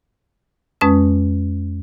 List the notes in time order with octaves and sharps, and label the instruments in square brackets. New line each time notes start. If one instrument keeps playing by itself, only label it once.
[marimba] F2 G#3 C#4 B4 D#6